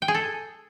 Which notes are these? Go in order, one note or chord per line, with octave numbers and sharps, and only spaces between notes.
G5
G#4
A4